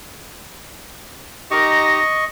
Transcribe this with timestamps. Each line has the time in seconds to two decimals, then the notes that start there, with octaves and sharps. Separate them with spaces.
1.51 D#4 G4 D#5 A#5 C#6